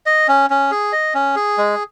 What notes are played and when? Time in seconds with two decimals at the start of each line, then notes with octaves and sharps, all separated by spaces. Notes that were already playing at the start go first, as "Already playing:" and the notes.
0.06 D#5
0.28 C#4
0.50 C#4
0.72 G#4
0.93 D#5
1.14 C#4
1.36 G#4
1.58 G#3